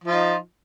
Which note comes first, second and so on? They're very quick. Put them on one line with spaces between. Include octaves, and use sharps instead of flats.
F3 F4 D#4